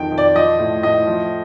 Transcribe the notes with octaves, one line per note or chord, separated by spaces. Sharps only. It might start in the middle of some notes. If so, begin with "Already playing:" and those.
Already playing: F2 D#3 G5
F2
D5
F3 D#5
A2
A2 D#5
F3